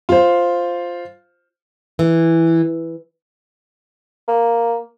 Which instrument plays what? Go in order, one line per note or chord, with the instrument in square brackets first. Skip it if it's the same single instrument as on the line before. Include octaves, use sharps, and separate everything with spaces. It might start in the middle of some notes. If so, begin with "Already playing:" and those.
[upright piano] F4 C5
[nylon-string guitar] E3
[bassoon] A#3